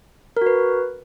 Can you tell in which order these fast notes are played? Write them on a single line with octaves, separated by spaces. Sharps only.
A#4 F#4 B4